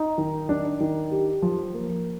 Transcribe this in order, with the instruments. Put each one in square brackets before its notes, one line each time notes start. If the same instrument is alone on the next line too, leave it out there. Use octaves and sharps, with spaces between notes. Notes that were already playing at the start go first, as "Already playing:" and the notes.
Already playing: [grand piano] D#4
D#3
D4
D#3
G4
F3
A#3